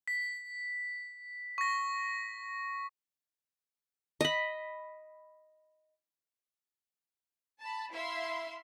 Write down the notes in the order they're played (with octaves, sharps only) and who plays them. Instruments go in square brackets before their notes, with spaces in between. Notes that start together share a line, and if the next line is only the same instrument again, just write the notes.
[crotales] B6
C#6 A#6
[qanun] D#5 B5
[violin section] A5 B5
E4 E5 F5 C6